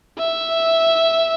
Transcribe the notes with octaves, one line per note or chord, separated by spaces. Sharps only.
E5